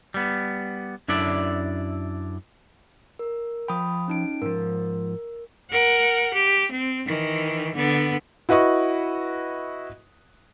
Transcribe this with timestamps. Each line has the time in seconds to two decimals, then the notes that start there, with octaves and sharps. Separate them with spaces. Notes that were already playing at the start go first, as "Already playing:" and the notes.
0.14 G3 B3
1.08 F#2 D4 E4 A4 D5
3.19 A#4
3.68 F3 G5 B5 D#6
4.08 C#4 D#4 D7
4.42 G#2 F3 A#4
5.70 A#4 F#5
6.34 G4
6.71 C4
7.06 D#3 E3
7.75 D3 B3
8.49 E4 F#4 B4 D#5 C#6